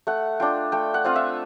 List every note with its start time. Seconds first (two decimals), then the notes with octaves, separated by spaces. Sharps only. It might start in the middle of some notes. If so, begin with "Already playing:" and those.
0.07 A3 F#5
0.40 D4 F4 G5
0.72 A3 G5
0.94 F#5
1.04 C4 F4 F5
1.16 E5